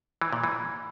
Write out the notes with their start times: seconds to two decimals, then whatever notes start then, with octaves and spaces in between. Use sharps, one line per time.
0.21 E3
0.33 A#2
0.44 E3